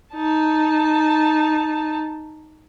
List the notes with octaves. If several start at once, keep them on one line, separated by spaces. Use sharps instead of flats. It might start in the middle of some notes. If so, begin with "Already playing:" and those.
D#4 A5